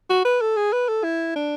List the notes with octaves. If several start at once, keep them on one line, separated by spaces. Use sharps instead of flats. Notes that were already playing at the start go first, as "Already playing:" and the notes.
F#4
B4
A4
G#4
B4
A4
E4
D4